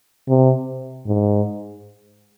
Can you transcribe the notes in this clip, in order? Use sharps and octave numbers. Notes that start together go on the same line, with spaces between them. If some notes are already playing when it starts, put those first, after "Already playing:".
C3
G#2